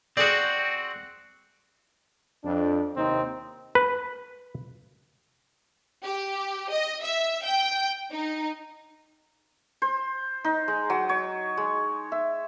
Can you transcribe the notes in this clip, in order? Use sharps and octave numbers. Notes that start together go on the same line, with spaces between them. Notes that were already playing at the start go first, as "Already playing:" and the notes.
C4 F#4 G#4 D5
F2 D4
D#2 C3 C4 D#4
B4
G4
D#5
E5
G5
D#4
C5
D#4
G#3
F#3
C#5
G#3
E5